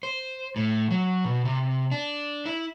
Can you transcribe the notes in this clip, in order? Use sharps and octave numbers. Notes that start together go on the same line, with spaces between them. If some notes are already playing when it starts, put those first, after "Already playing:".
C5
A2
F#3
B2
C3
D4
E4